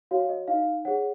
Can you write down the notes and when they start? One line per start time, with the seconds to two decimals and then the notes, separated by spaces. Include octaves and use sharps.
0.11 F#4 C#5 F5
0.29 D#5
0.48 D#4 F5
0.85 G#4 C#5 F#5